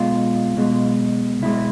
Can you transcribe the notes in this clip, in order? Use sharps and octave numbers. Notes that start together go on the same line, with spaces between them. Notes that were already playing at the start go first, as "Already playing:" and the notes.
Already playing: B1 B2 G#3 F4
B1 B2 G#3
B1 B2 G#3 E4